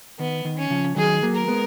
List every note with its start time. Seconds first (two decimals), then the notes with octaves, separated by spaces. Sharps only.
0.19 D#3 B3
0.45 D#3
0.58 C#4
0.70 C#3 F3
0.96 D#3 F#3 G#4
1.23 F#3 A#3
1.35 A#4
1.48 G#3 B3